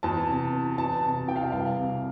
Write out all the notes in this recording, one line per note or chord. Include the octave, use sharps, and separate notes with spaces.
E2 A5
C3
E3
E2 A5
C3 A5
E3 G5
F5
G5
C2 F5
C3